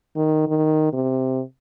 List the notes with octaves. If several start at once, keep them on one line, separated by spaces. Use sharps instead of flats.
D#3
D#3
C3